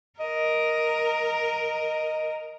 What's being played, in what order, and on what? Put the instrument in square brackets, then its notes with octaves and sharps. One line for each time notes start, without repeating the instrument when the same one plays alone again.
[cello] A#4 [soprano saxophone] D#5